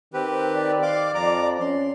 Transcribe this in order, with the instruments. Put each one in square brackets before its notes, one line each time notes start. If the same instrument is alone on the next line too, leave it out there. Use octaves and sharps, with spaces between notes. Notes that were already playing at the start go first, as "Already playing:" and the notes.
[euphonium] D#3 [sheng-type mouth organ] C4 G4 B4
[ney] D5
[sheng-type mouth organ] F5 C6 D6
[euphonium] F2 [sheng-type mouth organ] A#5 D6
[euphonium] C#4 [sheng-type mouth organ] C6